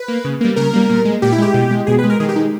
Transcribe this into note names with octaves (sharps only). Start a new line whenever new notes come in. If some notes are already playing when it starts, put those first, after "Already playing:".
Already playing: B4
A#3
C#3
G3 A#3
C#3 A#4
G3 A#3
A#2
G#3
A#2 G4
E4
G#3 G4
B2
G#3
B2 G#4
B4
G#3
A#4
D#3 G#4
G4
G#3 D#4